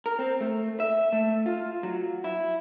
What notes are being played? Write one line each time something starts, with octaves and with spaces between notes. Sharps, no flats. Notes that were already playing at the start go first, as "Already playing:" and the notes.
A#4
C4
A3
E5
A3
F4
F#3
E4